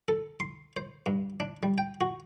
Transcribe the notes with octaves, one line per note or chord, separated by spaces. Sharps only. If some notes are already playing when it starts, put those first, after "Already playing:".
A4
C6
C5
G2
D4
G3
G5
F#4